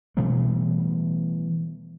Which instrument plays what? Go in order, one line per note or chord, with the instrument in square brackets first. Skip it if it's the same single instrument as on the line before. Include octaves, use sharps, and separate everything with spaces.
[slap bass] B2 E3 G3 A3